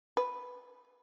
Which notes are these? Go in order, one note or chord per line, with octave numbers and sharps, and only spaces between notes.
B4